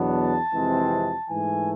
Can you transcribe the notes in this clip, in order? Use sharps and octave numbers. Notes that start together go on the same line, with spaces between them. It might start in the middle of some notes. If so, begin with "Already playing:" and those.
Already playing: E2 B2 F#3 B3 D4
A5
F2 C3 E3 G#3 C4
G#2 E3 A3 G#5